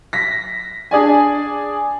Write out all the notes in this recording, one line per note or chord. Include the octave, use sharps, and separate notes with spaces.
A#6 B6
D4 G#4 D5 G#5